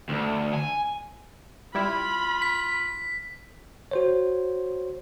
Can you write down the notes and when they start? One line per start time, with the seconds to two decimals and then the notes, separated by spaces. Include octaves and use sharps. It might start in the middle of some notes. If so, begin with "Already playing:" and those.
0.09 D2
0.54 G#5
1.75 G3 E4 F4 B5
2.42 B6
3.91 F#4 C5 C#5